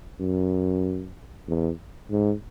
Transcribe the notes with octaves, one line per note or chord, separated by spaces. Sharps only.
F#2
E2
G#2